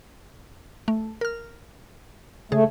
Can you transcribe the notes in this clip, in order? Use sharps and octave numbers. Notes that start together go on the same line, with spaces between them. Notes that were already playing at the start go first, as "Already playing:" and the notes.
A3
A#4 F6
C#3 A3 G#4